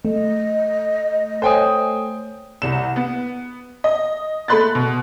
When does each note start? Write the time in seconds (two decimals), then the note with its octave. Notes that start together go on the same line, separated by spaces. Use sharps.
0.05 A3 D#5
1.42 A4 C5 C#5 G5 G#5 D#6
2.62 C2 E7
2.96 B3
3.84 D#5
4.48 A3 B5 C6 F#6 A6
4.75 B2